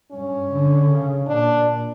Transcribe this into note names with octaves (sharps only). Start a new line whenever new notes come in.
G2 C#4
D3
C#3
A#2 D4